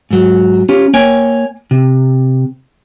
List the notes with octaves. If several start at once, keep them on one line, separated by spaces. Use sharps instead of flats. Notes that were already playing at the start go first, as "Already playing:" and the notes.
G#2 F#3
C#4 F4 G4
A#3 C#5 G5 G#5
C3